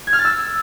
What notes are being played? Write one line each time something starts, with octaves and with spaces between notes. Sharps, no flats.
G#6
F6
A6
E6